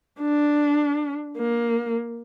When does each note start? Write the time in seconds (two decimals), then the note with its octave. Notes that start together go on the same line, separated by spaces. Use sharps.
0.21 D4
1.38 A#3